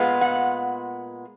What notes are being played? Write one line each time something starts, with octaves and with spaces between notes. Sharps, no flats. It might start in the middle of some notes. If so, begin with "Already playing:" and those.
Already playing: A#2 G#3 B3 F4
F#5